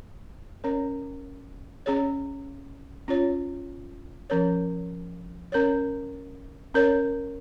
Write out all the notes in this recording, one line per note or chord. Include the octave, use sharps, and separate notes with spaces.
C#4 A#4 C#5
C#4 G#4 C#5
C#4 F4 C#5
F3 C#4 A#4 C#5
C#4 A#4 C#5
C#4 A#4 C#5